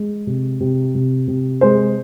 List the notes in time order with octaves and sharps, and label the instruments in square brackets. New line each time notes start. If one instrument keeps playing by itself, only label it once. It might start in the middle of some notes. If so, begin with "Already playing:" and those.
Already playing: [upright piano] G#3
C3
C3
C3
C3
G#3 C5